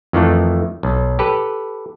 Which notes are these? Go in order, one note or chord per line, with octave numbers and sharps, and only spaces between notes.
F2 D#3 E3 A3
B1
G4 A4 B4